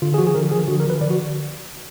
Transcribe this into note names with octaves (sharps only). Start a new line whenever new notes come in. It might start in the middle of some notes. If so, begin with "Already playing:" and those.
D3 F4
G#4
F3 F#4
G#4
D3 A#4
F3 G#4
D3 F#4
A#4
F3 B4
D3 D5
F#4